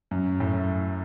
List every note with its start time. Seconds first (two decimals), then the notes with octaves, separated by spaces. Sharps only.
0.11 F#2
0.40 F#2 A2